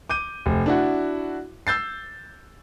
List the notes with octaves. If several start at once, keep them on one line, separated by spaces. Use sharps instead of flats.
D6 G6 D#7
F1
D4 E4 F#4
E6 G6 A6 C7